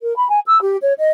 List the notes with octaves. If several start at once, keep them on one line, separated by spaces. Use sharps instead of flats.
A#4
B5
G#5
E6
G4
C#5
D#5